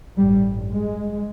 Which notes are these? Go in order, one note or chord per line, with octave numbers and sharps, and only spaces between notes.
A1 G2 G3
G#3